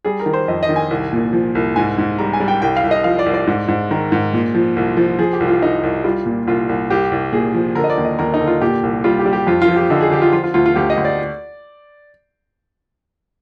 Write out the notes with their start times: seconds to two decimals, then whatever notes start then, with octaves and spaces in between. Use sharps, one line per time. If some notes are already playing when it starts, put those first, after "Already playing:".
0.05 G3 G#4
0.20 A#4
0.26 D#3
0.33 C5
0.48 F2 D#5
0.63 D#5
0.69 D#3
0.76 G#5
0.91 C2
1.13 A#2
1.33 F3
1.55 C2
1.76 G#2 G#5
1.98 G#2
2.18 G3 A#5
2.33 G#5
2.40 G3
2.48 G5
2.62 C2 G5
2.77 F5
2.84 C2
2.91 D#5
3.04 F3 F5
3.19 D5
3.26 C2
3.34 D5
3.47 G#2
3.68 G#2
3.91 D#3 A#4
4.12 G#2
4.33 A#2
4.55 F3
4.76 C2
4.97 F3
5.19 F3 G#4
5.33 G4
5.40 C2
5.48 F4
5.62 C2 D#4
5.83 C2
6.04 G3 F4
6.26 A#2
6.47 C2 F4
6.69 C2
6.90 C2 G4
7.11 C2
7.33 A#2 G#4
7.54 F3
7.75 D3 A#4
7.84 D#5
7.90 D5
7.98 D#2
8.05 D#5
8.19 D#2 A#4
8.34 D#4
8.40 D3
8.47 F4
8.61 A#2 G4
8.83 C2
9.04 G3 F4
9.19 G4
9.26 G3
9.33 G4
9.47 F2 F4
9.62 F4
9.68 F3
9.76 G4
9.90 D3 D#4
10.01 G#4
10.11 D3 G4
10.22 F4
10.33 F3 F4
10.44 F4
10.54 D2 F4
10.66 F4
10.76 D2 G4
10.90 D#5
10.97 D2
11.05 D5